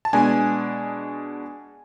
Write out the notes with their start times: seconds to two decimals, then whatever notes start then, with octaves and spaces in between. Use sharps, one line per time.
0.05 A5
0.13 B2 G#3 B3 D4 G#5